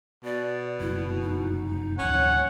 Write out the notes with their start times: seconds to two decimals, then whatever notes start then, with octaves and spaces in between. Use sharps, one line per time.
0.25 B2 D5
0.80 F1 F#2 E4
1.23 D#4
1.99 A1 D2 F3 C#4 C#5 F#5